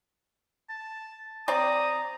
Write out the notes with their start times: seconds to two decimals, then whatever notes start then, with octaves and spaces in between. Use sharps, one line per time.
0.69 A5
1.48 C4 D5 A#5 D#6